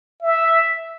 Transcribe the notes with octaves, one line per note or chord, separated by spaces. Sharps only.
E5